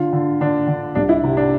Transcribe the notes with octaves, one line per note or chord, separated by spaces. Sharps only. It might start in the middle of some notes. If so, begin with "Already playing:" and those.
Already playing: D3 F4
D3
D3 D4
D3
C2 D4
E4
C3
D4